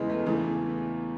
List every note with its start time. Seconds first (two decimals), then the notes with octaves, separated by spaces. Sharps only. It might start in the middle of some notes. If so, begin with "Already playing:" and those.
Already playing: E2 C#3 E3 G#3
0.10 A3
0.26 E2 C#3 E3 A3